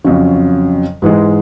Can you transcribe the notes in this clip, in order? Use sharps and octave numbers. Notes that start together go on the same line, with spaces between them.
F2 C#3 F#3
G#2 E3 G#3